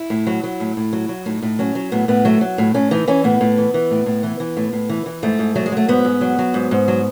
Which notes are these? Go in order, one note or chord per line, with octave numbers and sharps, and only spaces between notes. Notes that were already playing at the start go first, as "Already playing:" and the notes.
Already playing: E4
A2
F#3
F#3
A2
A2
F#3
F#3
A2 D#4
A2
F#3 C#4
F#3
A2 B3
A2 B3
F#3 A3
F#3
A2
A2 C#4
E3 D#4
E3 C#4
A2 B3
A2
E3
E3
A2
A2
E3
E3
A2
A2
E3
E3
G#2 A3
G#2
F#3 A3
G#3
F#3 A3
G#2 B3
G#2
F#3
F#3
G#2
G#2
F#3